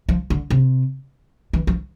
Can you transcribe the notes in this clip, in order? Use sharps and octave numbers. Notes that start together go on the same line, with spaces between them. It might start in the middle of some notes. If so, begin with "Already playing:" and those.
F3
D3
C3
E3
F3